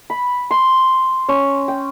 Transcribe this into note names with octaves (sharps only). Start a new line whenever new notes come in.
B5
C6
C#4
G5